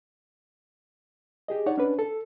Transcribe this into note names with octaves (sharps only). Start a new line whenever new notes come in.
G4 G#4 D#5
D#4 C#5 D5 F#5
C#4 D4 B4
A4